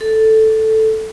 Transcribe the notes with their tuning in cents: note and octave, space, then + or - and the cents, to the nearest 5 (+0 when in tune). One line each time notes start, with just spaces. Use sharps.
A4 +0